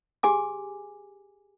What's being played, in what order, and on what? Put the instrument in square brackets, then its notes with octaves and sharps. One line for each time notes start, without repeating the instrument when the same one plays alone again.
[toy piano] G4 G#4 G#5 D6